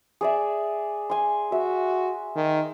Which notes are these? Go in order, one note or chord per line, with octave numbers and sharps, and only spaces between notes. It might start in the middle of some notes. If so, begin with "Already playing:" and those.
G#4 D5 E5
G#5 C6
F#4 E5
D#3